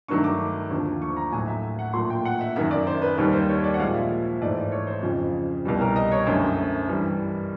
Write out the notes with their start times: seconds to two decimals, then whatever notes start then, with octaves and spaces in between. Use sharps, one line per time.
0.08 G2 D#3 F#3 A3 C#6
0.24 D6
0.70 D#2 D3 F3 A3
1.02 C#6
1.17 A#5
1.32 A2 F#3 A3 G#5
1.48 E5
1.63 E5
1.79 F#5
1.94 A#2 F#3 A3 C6
2.10 G5
2.25 F#5
2.41 E5
2.56 F#2 D#3 F#3 E5
2.71 D5
2.87 C5
3.02 B4
3.17 D#2 D#3 G3 B4
3.33 C5
3.49 C#5
3.64 D5
3.74 F#5
3.79 A#2 F3 G#3 F5
3.95 E5
4.41 G#2 E3 A3 D5
4.57 D5
4.72 C#5
4.87 C5
5.03 F2 C#3 F3
5.65 C2 B2 G3
5.81 A#4
5.96 D#5
6.12 C#5
6.26 F#2 D3 F#3 A3 C5
6.88 G2 E3 G3